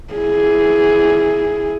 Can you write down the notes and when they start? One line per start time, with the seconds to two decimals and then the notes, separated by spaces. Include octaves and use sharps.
0.14 E4 G#4